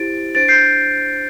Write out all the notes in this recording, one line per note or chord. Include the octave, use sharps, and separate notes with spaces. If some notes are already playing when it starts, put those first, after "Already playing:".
Already playing: E4 G4 C5 A6 D7
D4 C5 A6 D7
G6 C7